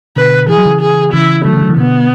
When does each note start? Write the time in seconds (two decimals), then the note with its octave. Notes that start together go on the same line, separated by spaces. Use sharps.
0.16 B2 D3 B4
0.48 E3 G#4
0.58 F#3
0.66 C#3 E3
0.81 G#4
1.13 C#3 E3 E4
1.45 D3 F#3 A3
1.53 C#3 E3
1.62 D3 F#3
1.69 C#3 E3
1.77 B2 D3 B3